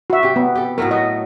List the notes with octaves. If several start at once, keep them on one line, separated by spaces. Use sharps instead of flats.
F#4 E5
C3 G4
B3
G4 A4
A2 F#3 A3 A#4
F#4 D#5